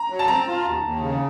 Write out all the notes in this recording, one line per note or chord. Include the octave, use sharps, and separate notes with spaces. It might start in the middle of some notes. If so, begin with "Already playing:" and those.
Already playing: A#5
F#3
A5
C4 A#5
F4
D#2
D#2
C#3